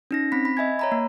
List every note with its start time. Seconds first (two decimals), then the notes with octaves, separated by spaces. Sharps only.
0.11 C#4 D#4 A#6
0.32 C4 B5 B6
0.45 B5
0.57 D#5 E5 G#5 G#6
0.79 C#5 A#5 B5
0.92 A#3